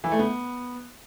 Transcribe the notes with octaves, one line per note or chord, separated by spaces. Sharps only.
E3
A3
B3